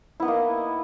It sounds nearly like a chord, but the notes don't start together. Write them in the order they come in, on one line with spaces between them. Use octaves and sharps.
E4 B3 D#4 A#3